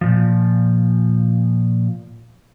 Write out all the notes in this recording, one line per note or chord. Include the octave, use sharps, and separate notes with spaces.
A#2 F3